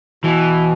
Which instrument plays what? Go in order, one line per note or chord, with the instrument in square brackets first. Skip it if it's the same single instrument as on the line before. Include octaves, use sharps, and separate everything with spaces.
[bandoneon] B2 [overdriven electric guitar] E3